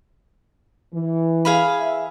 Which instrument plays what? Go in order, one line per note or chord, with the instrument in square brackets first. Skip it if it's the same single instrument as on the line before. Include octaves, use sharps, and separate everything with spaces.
[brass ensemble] E3
[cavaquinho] G#4 F5 B5
[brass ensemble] E5